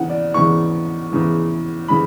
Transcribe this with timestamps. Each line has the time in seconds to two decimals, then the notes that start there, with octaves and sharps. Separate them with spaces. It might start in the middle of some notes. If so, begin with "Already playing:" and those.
Already playing: E2 C#3 E3 F#5
0.09 D5
0.34 E2 C#3 E3 C#6
1.11 E2 C#3 E3
1.88 C#3 E3 B5